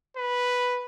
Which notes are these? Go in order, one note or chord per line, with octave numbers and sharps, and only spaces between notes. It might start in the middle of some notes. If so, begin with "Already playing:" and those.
B4